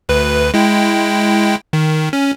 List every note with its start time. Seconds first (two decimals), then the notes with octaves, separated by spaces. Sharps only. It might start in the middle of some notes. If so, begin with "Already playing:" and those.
0.09 D2 B4
0.54 G#3 E4 G5
1.73 D#3
2.13 C#4